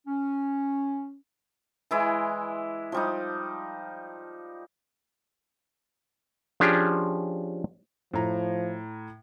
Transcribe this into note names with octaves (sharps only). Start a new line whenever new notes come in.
C#4
E3 G#3 E4 D5
F3 G3 D#4
F3 C#4 D4 G4 G#4
A2 F3 A#5